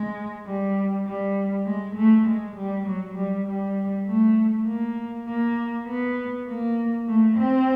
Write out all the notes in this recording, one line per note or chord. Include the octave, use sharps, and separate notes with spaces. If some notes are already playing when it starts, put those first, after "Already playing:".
Already playing: G#3
G3
G3
G#3
A3
G#3
G3
F#3
G3
G3
A3
A#3
A#3
B3
A#3
A3
C4